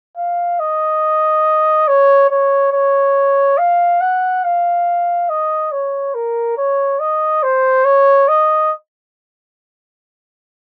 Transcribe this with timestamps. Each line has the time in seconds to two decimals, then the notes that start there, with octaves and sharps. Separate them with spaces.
0.17 F5
0.60 D#5
1.88 C#5
2.30 C#5
2.73 C#5
3.58 F5
4.01 F#5
4.44 F5
5.30 D#5
5.72 C#5
6.14 A#4
6.58 C#5
7.00 D#5
7.43 C5
7.85 C#5
8.28 D#5